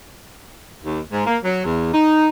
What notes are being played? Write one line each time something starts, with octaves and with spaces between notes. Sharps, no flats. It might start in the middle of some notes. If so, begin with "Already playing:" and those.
D#2
G#2
A#3
F#3
E2
D#4